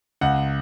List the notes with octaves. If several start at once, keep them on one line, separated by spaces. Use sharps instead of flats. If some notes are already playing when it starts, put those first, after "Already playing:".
C#2 F#5